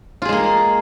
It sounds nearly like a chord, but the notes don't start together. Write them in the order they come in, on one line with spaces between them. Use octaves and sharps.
F4 G#4 G#3 A#3